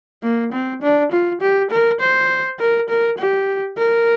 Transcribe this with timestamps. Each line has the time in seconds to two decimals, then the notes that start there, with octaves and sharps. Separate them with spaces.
0.23 A#3
0.53 C4
0.82 D4
1.12 F4
1.41 G4
1.71 A#4
2.01 C5
2.59 A#4
2.89 A#4
3.18 G4
3.78 A#4